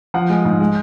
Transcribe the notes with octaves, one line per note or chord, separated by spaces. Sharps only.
F3 F#5
G#3
G#2
G#3